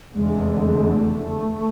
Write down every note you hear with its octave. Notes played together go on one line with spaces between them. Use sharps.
F1 E2 D3 G#3
A3